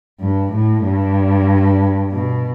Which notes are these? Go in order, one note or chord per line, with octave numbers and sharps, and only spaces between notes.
G2
A2
G2
B2